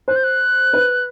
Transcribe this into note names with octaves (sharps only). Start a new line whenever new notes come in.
C5 F#6
G6
F#6
B4